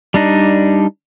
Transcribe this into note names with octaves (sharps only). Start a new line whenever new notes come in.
G3 D4 D#4